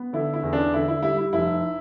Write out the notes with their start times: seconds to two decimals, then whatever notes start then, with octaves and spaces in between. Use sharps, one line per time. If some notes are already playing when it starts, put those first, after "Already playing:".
Already playing: B3
0.13 D3 E4
0.34 E4
0.43 E2
0.53 D4
0.73 D3 E4
0.88 E4
1.02 G3 E4
1.18 E4
1.33 F1 E4